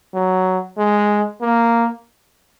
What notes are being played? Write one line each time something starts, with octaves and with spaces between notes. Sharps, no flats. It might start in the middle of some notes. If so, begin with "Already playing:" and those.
F#3
G#3
A#3